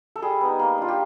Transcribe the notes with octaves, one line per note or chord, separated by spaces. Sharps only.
A4
G3 G#4
B3 D#4
A#3
D4 F4
G4